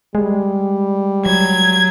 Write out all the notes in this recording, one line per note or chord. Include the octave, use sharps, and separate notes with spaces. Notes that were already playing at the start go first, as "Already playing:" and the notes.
G3 G#3
F#3 G#6